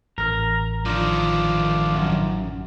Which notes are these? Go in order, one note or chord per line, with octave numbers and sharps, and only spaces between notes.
A1 A#4 F6
D#3 F3 D4 F4
F#2